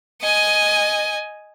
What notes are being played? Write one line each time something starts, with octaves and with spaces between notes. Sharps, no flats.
D#5 G#5